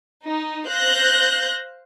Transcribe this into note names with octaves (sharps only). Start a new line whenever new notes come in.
D#4
C5 F5 F#6 G6 A#6